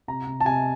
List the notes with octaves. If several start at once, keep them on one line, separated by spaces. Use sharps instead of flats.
C3 A#5
C3
A5
C3 G#5